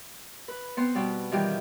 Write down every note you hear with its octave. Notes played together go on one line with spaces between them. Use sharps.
B4
B3 C4 C6
B2 G3
D#3 E3 G3 F4 G4